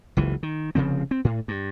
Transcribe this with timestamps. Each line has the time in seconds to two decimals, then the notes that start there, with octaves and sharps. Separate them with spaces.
0.17 F#1 C#2 E3
0.43 D#3
0.75 F1 C#3 F3 C4
1.11 C4
1.25 A2
1.48 G2